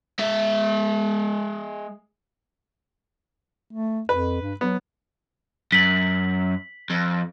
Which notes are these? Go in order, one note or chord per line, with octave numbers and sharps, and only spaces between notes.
G#3 E5
A3
F2 B4
G2
F#3 B3
F#2 B6 F#7
F2